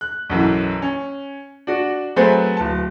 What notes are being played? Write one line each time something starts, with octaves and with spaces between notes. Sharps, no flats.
F#6
B1 F#2 E3
C#4
D4 F#4
F#3 A3 C4 G#4 B4 C5
D1 A5